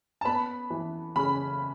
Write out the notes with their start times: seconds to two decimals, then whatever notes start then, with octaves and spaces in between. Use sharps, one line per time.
0.21 A5
0.25 B3 B5
0.70 E3
1.16 C#3 B5